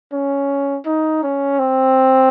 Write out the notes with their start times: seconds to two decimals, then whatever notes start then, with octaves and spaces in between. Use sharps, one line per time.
0.13 C#4
0.86 D#4
1.23 C#4
1.59 C4